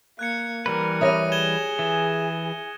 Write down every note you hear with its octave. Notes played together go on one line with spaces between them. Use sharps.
A#3 F#6 G#6 C#7
E3 G3 A#4 B4
G4 C#5 E5 D#6 A#6 D#7
G#4 G#6 E7 G7
E3